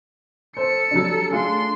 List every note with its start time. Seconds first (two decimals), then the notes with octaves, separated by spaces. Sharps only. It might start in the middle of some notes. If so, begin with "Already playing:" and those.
0.57 A4 C5 C#7
0.91 F#3 G3 D4
1.31 A3 D4 F4 G#4 C6